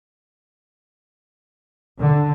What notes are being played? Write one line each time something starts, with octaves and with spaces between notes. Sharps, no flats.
D3